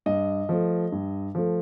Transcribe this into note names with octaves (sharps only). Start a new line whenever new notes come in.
G2 D#5
F3 A3
G2
F3 A3